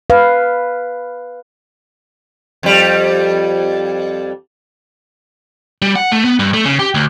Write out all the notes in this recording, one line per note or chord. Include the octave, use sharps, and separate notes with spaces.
B4 F5
F2 G3
G3
F#5
A3
B3
G2
A3
C#3
G4
D2